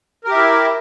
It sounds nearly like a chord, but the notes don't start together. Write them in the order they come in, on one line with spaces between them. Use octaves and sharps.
A#4 G4 E5 E4